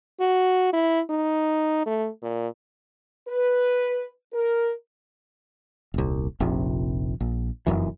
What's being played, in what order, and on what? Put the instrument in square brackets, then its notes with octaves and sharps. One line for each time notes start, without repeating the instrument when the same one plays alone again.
[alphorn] F#4
E4
D#4
A3
A#2
[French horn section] B4
A#4
[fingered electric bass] D#1 C2
F1 A#1 C3
A#1
F1 A#1 F#2 E3